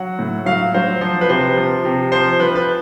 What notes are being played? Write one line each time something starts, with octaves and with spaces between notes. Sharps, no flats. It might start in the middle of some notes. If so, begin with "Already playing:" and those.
Already playing: F#3 F#5
A2
F#3 F5
F#3 C5
F3 C5
B4
C3 C5
F3
C3
F3 C5
F3 B4
B4